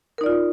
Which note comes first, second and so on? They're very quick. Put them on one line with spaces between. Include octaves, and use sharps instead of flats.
A#4 D#4 D5 F4